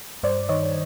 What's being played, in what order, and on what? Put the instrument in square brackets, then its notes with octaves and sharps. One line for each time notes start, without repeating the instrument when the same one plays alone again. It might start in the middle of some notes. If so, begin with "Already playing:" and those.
[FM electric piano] G2 C5 D5
D#3 C#5 D#5